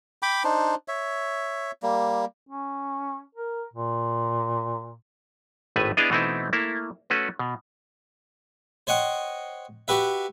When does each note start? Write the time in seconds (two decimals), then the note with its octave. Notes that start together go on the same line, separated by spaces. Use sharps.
0.23 G5 B5 D6
0.44 D4 D#4 C5
0.88 C#5 E5
1.83 G3 A#3
2.49 C#4
3.35 A#4
3.73 A#2
5.76 G#1 A2 A3 B4 G#5
5.97 B3 D4 E4 G#4 D#5 F5
6.10 B2 E3 A3 C4 D#4 E4
6.53 A3 A#3 E4
7.10 A3 C#4 F#4 B4
7.39 B2
8.87 C5 C#5 D#5 F#5 G5
9.88 F#4 G4 B4 E5